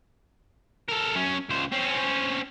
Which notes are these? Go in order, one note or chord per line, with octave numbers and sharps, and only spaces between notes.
A4 A#4
F#2 C#4
C#2 C5
C4 C#4